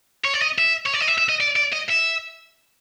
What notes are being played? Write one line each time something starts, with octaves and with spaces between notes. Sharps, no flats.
C#5
D5
D#5
E5
C#5
D5
D#5
E5
E5
D#5
D5
D5
D#5
E5